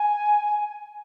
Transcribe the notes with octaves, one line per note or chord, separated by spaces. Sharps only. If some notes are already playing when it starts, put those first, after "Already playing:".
Already playing: G#5